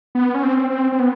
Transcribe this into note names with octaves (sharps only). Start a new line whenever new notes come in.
B3
C#4
C4
C4
C4
B3